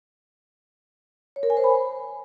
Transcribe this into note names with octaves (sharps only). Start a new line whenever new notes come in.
C#5
A#4
G#5
C5
B5